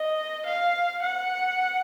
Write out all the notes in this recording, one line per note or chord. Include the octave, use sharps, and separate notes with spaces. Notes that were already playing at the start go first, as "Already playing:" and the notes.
Already playing: D#5
F5
F#5